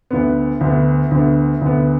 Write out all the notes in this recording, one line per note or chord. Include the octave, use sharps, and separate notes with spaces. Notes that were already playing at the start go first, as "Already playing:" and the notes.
D2 D3 B3
D2 D3 B3
D2 D3 B3
D2 D3 B3